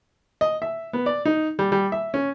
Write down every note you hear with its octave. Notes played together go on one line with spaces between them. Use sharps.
D#5
E5
B3
D5
D#4
G3
G3
E5
C#4